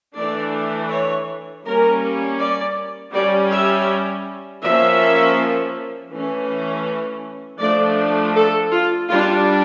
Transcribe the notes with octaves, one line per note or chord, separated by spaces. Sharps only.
E3 A3 D4 D5
C#5
G3 A#3 C#4 A#4
D5
G3 C#4 D5
E5
F3 A#3 C#4 E5
E3 A3 C#4
F3 A3 D4 D5
A4
F4
G3 D4 F4